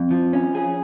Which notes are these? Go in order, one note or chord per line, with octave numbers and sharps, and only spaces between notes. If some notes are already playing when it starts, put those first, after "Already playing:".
Already playing: F2
F3
C#4
G#4